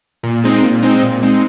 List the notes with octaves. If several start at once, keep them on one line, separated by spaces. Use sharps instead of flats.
A#2
G#3 C4 D#4
A#2
G#3 C4 D#4
A#2
G#3 C4 D#4